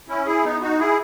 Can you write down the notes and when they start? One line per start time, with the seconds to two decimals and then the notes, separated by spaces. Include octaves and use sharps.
0.08 C#4 E4
0.26 E4 G#4
0.44 B3 D#4
0.61 D#4 F#4
0.79 E4 G#4